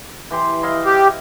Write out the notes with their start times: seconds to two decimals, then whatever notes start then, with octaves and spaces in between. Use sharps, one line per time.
0.31 E3 G4 C6
0.63 E4 D#5 F5
0.85 G4